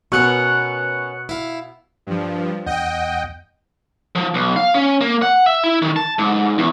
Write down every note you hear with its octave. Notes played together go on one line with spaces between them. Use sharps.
B2 B3 C#4 A#4 C#6 F#6 C#7
E4 F5
G2 F3
E2 D#5 F#5 G5 G6
F3
B1
F5
C#4
A#3
F#5
E5
E4
D#3
A5
G#2
E2